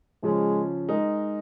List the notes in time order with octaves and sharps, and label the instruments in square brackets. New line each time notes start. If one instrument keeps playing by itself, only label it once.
[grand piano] C#3 F3 C#4 [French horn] G#3
[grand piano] G#3 D#4 A#4